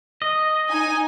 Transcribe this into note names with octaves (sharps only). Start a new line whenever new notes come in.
D#5
D#4 G#5